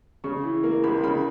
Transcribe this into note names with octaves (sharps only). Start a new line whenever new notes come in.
C#3 C#6
E3
A#3
C#2 B5
C#3 B5